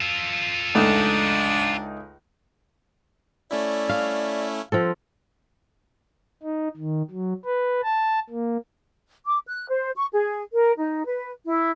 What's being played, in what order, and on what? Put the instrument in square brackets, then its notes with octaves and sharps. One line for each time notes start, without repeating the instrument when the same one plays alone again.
[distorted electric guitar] F4 A4
[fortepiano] C#2 A3 D#4 [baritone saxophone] D4
[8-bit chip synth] A3 C#4 E4 [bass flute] D5
[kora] F5
F3 C4 A4
[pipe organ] D#4
D#3
F#3
B4
A5
A#3
[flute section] D6
F#6
C5
C#6
G#4
A#4
D#4
B4
E4